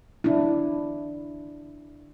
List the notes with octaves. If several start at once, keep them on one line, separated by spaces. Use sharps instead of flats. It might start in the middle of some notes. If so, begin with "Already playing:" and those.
D4 E4